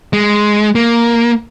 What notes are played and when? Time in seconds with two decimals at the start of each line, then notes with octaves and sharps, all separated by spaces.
0.13 G#3
0.75 A#3